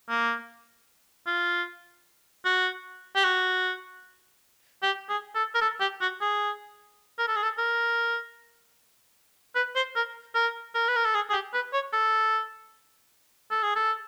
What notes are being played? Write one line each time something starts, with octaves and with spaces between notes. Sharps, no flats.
A#3
F4
F#4
G4
F#4
G4
G#4
A4
A#4
A4
G4
F#4
G#4
A#4
A4
G#4
A4
A#4
B4
C5
A#4
A#4
A#4
B4
A#4
A4
G#4
G#4
G4
B4
C#5
A4
A4
G#4
A4